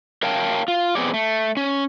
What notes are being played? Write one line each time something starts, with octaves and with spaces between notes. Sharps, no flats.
A#4 C#5 F5 G5 A5
F4
B3 C4 G4 G#4 C#5 D5
A3
C#4